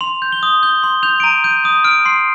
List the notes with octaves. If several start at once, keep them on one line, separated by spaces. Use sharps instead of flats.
C6 F7
G6
G7
D#6
G6 G7
C6 G7
G6 F7
D7
A#5 D#7
G6 D#7
D#6 D#7
F6 D7
C6 C7